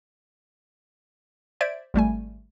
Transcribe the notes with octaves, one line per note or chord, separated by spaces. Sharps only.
C5 D5 E5 G#6 D7
G#1 G3 A3 G#5